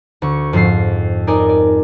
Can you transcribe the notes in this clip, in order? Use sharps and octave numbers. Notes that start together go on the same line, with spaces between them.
D2 C#6
F2 G#2 F6 C7
D#4 A#4 D5 D#5 G#5
D5